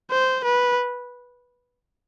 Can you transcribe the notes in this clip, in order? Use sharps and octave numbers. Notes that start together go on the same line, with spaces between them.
C5
B4